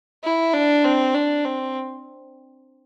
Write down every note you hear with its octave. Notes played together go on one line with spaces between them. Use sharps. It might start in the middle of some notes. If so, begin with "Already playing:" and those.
E4
D4
C4
D4
C4